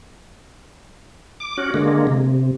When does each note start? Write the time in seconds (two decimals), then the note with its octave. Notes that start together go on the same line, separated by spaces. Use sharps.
1.40 D6
1.58 C#4 F#4
1.74 D3 G#3 A#3
2.07 C3